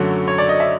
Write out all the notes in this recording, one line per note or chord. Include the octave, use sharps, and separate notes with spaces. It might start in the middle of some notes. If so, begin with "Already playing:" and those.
Already playing: F#2 D3 F#3 A3
C#5
D5
D#5
E5